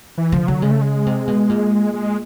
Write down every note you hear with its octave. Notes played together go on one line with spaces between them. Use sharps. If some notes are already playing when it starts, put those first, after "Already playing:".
E3
D3 F3
D3 F#3
C#3 G#3
A3
G#3
C3
B2
A#2
G#3